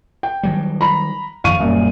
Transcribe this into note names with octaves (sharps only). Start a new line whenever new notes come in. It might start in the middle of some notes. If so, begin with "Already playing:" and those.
G5
D#3 F#3 G3
A#5 B5
F#2 D#3 F3 F5 C#6 D#7
D#1 F#2 A#2 G3